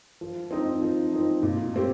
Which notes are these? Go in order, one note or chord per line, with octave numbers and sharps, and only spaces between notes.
F3
C4 D#4
F3
C4 D#4
A#2
A3 C4 G4